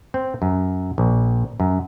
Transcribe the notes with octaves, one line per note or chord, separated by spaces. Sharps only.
C4
F#2
A#1
F#2